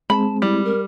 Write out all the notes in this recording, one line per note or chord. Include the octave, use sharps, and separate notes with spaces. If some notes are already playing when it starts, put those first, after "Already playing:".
G#3 C4 A5 B5
G3 E4
A#4